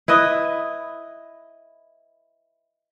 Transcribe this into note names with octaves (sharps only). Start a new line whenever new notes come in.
E4 B4 D#5 E5